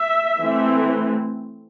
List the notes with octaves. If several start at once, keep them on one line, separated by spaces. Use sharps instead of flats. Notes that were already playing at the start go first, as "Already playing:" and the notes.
Already playing: E5
E3 A3 C4